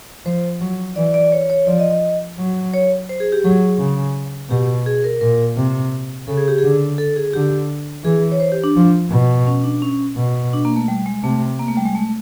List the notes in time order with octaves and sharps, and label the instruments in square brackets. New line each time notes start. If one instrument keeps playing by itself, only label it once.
[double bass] F3 [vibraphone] C5
[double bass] F#3
[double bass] E3 [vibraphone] D5
[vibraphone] D5
C#5
C#5
[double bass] F3 [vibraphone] D5
[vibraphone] D#5
D#5
[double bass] F#3
[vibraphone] C#5
C5
G#4
G4
[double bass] F#3 [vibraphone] G#4
[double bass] C#3
[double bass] B2 [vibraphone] G4
[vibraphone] G#4
A#4
[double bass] A#2 [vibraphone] A#4
[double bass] C3
[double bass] C#3 [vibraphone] A4
[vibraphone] G#4
G4
G#4
[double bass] D3
[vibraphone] A4
G#4
[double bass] D3 [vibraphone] G4
[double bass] E3 [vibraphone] G#4
[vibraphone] C#5
C5
G4
D4
[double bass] F3
B2
[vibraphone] C#4
D4
C#4
[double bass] B2
[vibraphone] D4
A#3
A3
G3
G#3
[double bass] C3 [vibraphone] A3
[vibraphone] A#3
A3
G3
G#3
A3